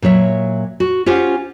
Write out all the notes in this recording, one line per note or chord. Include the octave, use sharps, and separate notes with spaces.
A#2 F#3 C#5 E5
F#4
C#4 F4 G4 C5 F#5